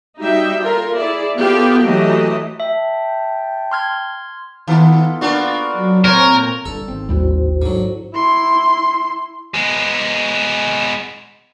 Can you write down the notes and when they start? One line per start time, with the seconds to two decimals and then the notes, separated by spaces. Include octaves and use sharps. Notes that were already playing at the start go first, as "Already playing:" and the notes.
0.19 G3 D#4 F#4 E5 G5
0.63 F4 A4 A#4
0.96 E4 G#4 D5
1.37 B3 F4 G4 A4 F5 G5
1.82 E3 F#3 A3 G4 D#5
2.60 E5 G5 A5
3.71 C6 F6 G#6
4.67 D#3 B3 F4 A4
5.21 A#3 D4 F4 F#4 B4
5.73 F#3
6.04 A#2 C4 A#4 C5 C#5 G#5 C#6
6.65 G1 G2 A4
6.88 G#1 C4
7.09 A1 D#2 G3 E4 F#4 C5
7.62 G#2 D3 F#3
8.14 E4 C6
9.54 G#3 B3